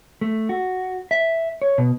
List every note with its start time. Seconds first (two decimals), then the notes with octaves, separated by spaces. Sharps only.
0.21 A3
0.49 F#4
1.11 E5
1.62 C#5
1.78 B2